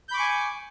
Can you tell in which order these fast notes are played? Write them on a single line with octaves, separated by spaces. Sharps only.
G6 B5 D6 C#6 G#5